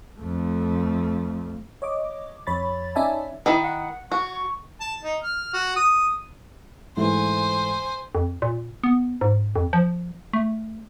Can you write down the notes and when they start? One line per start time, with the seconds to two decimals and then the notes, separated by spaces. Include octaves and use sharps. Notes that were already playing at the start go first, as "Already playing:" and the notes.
0.19 F2 A3
1.82 C#5 D#5 D6
2.47 F2 C#5 B5 A6
2.95 C#4 D#4 D5 E5 G#5 A5
3.46 D#3 E4 D#5 B5
3.62 F#5
4.12 F#4 C#6
4.81 A5
5.03 D#4
5.23 F6
5.53 F#4
5.76 D#6
6.97 G#2 E3 A3 C5 G#5
8.15 F2
8.42 A#2
8.84 B3
9.21 G#2
9.56 F2
9.73 F3
10.33 A3